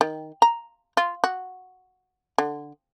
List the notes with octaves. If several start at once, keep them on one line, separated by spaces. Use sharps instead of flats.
D#3
A#5
F4
F#4
D3